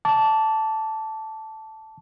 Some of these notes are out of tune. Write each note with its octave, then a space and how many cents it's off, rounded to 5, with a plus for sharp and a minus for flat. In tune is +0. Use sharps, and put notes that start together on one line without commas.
A5 +0 D6 -30